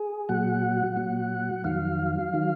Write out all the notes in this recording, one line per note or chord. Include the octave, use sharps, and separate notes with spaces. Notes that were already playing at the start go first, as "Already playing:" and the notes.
Already playing: G#4
A#2 F#3 F#5
A#2 F#3
F2 D#3 F#3 F5
D#3 F#3